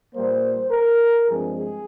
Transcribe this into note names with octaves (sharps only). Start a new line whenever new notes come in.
A#2 G3 A#3 C5
A#4
G2 F3 G#3 C4 G#4
G#4